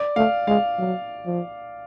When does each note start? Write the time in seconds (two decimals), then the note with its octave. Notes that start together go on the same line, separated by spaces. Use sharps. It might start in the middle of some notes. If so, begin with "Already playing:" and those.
Already playing: D5
0.16 A3 F5
0.47 G#3 F5
0.79 F#3
1.26 F3